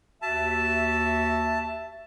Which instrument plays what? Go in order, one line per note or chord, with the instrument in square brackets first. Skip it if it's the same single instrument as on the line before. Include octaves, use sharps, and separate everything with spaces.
[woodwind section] D#2 F#4 E5 [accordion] A5